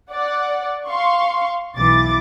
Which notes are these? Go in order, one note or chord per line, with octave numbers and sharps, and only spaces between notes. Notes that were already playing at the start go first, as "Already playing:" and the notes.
D5 F#5
F5 C6 C#6
B1 E3 D6 A6